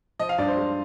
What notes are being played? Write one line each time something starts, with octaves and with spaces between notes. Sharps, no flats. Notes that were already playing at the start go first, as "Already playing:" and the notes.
F3 D#5
F5
G2 D5
C5
G#3